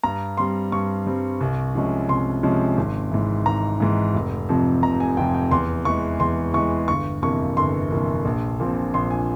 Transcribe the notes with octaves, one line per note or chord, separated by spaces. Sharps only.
G2 A#5
G3 C4 C6
G2 C#6
G3 C4
C2
C3 F3 G#3 C#4
C2 C6
C3 F3 G#3 C#4
G#1
G#2 E3
G#1 A#5
G#2 E3
F1
F2 C3 F3
F1 A#5
G#5
F2 C3 F3 G5
G5
E2 C6
E3 G#3 C#6
E2 C6
E3 G#3 C#6
G1 C#6
F2 C3 E3 A#3 C#6
G1 C6
F2 C3 E3 A#3
A#1
A#2 F3 C4
A#1 C6
G#5